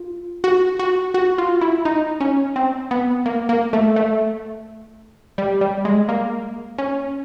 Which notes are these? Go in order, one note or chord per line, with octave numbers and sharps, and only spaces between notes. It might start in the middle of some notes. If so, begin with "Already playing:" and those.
Already playing: F4
F#4
F#4
F#4
F4
E4
D#4
C#4
C4
B3
A#3
A#3
A3
A3
G3
G3
G#3
A#3
C#4